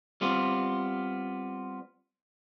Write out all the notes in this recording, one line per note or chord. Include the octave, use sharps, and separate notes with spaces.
G3 B3 C4 F4